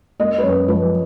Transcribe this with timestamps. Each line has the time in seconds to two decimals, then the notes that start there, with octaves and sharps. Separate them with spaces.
0.19 A#3 D#5
0.38 B4
0.43 F#2 C#5
0.68 F3 B4